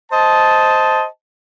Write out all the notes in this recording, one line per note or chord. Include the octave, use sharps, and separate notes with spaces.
C5 D#5 A5